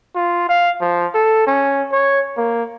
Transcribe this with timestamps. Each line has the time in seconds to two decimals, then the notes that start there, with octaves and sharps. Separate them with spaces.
0.15 F4
0.49 F5
0.81 F3
1.14 A4
1.47 C#4
1.92 C#5
2.37 A#3